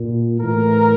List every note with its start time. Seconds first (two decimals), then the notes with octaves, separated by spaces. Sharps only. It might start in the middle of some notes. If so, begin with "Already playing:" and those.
Already playing: A#2
0.41 A2 E3 A#4